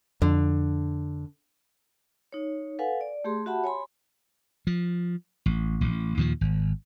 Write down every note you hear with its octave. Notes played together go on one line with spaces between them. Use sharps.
F2 D3
D#4 C#5
A4 B4 F5 F#5 G#5
D5
A3 G4 G#4 C6
F#4 G4 E5 F#5 A5 B5
C#5 G#5 B5 C6
F3
A1
A1
D#2 A#2 D#3 F3
G#1